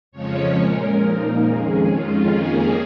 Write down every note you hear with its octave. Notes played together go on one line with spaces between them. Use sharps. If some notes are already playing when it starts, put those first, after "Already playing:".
F2 C#3 F3 G#3 C#4 C#5
A#2 G#3 C#4 A#4
A#2 F3 A#3 D#4
F2 D#3 G#3 C#4 G#4
F2 D#3 G#3 C#4 F4
F2 D#3 A#3 C#4 G#4